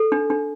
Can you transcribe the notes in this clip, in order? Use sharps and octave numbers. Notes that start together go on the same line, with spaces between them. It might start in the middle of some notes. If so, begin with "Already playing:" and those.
Already playing: A4
D4
D4